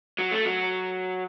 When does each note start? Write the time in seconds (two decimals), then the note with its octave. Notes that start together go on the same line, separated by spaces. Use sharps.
0.19 F#3
0.31 A3
0.45 F#3